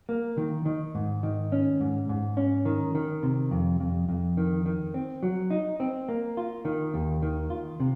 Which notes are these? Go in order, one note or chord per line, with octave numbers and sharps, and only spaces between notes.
A#3
D#3
D#3
G#2
D#3
C#4
G#2
G#2
C#4
D#3
D#3
C3
F2
F2
F2
D#3
D#3
C4
F#3
D#4
C4
A#3
F4
D#3
D#2
D#3
F4
C3